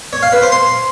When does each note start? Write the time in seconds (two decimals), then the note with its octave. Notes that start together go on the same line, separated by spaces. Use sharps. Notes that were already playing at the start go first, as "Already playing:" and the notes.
0.13 C#5
0.23 F5
0.32 B4
0.42 C5
0.52 C6